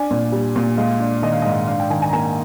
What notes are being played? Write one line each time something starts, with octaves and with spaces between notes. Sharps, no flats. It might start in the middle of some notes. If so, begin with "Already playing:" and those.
Already playing: D4 G#5
A#2
G3
A#2
G#3 F5
D4
D#3 D#5
F5
G#2 D#5
D4 F5
G5
D#3 G#5
G#5
A#5
A#3 G#5